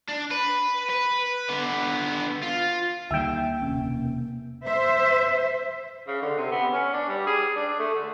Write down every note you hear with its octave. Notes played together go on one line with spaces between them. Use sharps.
D4
B4
B4
D3 B3
F4
D2 D#3 G3 A#3 E5 G5
E1 C3 C#4
C5 E5
C#3
D3
C3
B3
C#4
D4
G3
G#4
D4
A3
D3